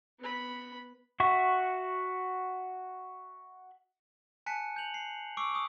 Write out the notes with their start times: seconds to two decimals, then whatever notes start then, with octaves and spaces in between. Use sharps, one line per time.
0.19 B3 B5
1.20 F#4 E5 F#5 C#6
4.46 G#5 A5 F#6 B6 C#7
4.76 G6 C#7 F7 F#7
4.94 C7
5.37 C#6 D6 E6 C7 D7
5.54 C#6 D#6